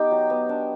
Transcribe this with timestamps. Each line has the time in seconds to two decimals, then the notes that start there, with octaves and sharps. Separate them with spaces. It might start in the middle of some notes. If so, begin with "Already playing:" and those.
Already playing: B3 D#4 G4
0.11 F#3
0.30 B3
0.49 D4